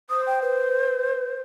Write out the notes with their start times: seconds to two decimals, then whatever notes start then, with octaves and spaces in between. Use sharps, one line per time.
0.10 C5 D#6
0.27 G5
0.42 B4